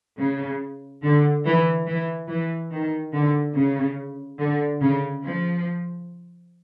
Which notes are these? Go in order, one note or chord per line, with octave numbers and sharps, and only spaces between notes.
C#3
D3
E3
E3
E3
D#3
D3
C#3
D3
C#3
F3